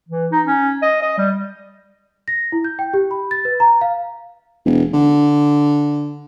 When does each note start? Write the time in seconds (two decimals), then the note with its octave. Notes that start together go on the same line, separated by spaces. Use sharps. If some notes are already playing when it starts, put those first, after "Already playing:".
0.09 E3
0.32 D#4
0.46 C#4
0.82 D#5
1.02 D#5
1.18 G3
2.28 A#6
2.52 E4
2.64 G6
2.79 G5
2.94 G4
3.11 B5
3.31 A6
3.45 B4
3.60 A#5
3.81 F5
4.65 E1
4.93 D3